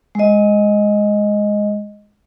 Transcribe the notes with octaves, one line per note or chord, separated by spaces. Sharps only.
G#3 D#5